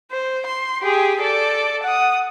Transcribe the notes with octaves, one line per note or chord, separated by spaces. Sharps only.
C5
C6
G4 G#4
A4 D5
F#5 D#6